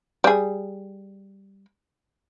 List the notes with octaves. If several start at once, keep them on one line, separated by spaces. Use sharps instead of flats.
G3 G#4